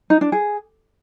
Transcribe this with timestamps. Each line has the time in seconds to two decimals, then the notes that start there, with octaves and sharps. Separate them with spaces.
0.10 D#4
0.21 D4
0.32 G#4